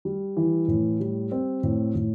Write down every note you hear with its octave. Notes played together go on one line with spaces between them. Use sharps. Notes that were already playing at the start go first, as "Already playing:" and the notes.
G3
E3
A2
G3
C4
A2
A2